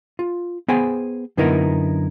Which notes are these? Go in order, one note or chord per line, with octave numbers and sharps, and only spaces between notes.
F4
B3 G#4 C5 G5 G#5
F#2 D3 B3 D#4 E4 A#4